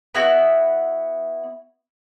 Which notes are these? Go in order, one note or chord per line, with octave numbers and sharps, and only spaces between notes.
B3 E4 F#4